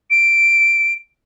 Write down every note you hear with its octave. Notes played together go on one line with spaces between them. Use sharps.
D7